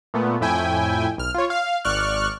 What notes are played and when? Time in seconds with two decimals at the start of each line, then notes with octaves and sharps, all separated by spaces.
0.14 A#2 A3 B3
0.41 F2 A2 E4 G5 G#5
1.18 B1 F6
1.35 F4 C#5
1.50 F5
1.85 G#1 D5 C#6 F6 F#6